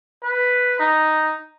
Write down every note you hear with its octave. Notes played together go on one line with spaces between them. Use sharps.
B4
D#4